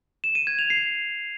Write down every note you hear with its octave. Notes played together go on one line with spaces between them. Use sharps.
E7
D#7
G#6
F7
C7